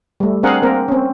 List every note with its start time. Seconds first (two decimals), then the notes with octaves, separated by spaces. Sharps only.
0.20 G3 A3
0.43 C4 D4 G#4 A#4 F5 F#5
0.62 A#3 C4 A#4
0.88 C4 C#4